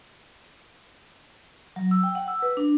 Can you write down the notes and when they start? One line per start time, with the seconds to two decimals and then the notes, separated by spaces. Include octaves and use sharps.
1.76 F#3
1.91 E6
2.03 G5
2.15 F#5
2.28 E6
2.42 B4
2.57 D4